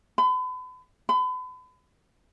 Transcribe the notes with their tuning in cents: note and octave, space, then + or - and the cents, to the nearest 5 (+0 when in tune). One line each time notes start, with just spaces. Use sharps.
B5 +40
B5 +40